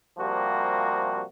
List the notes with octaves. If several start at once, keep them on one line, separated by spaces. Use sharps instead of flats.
C3 F3 G3 A#3 F#4